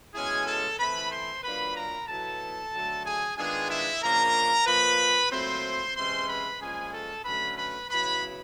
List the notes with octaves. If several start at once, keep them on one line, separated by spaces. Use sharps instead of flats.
B2 G#3 C#4 E4 G#4 G#5
A4 A5
E3 A3 C4 B4 B5
C5 C6
F#3 A#3 D4 F4 B4 B5
A#4 A#5
B2 F#3 B3 E4 A4 A5
D3 F#3 A3
G#4 G#5
D#3 G#3 B3 D4 F4 G#4 G#5
E4 E5
C#3 F3 A#3 D4 A#4 A#5
A#2 F3 A#3 B4 B5
A#2 F#3 A3 C4 E4 C5 C6
C3 E3 G#3 C#4 C5 C6
B4 B5
A#2 F3 G#3 C#4 G#4 G#5
A4 A5
D3 F#3 A3 C#4 B4 B5
B4 B5
C#3 F#3 B3 E4 B4 B5